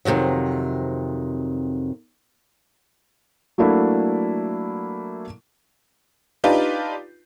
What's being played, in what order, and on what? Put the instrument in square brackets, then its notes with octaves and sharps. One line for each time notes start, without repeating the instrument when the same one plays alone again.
[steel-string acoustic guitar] F2 G#2 C3 D#3 F#3
[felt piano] F#3 A3 A#3 D4 E4
[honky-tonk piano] D4 D#4 F4 G4 B4